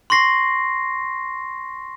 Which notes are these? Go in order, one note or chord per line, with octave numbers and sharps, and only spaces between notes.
C6 C#6 A#6 C7